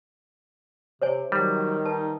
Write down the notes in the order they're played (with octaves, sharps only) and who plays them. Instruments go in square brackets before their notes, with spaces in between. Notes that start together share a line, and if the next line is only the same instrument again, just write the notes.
[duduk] C3 [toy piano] C5 C#5 G#5
[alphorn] D#3 [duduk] F#3 [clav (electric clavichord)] G3
[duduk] D#4 [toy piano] B4 A5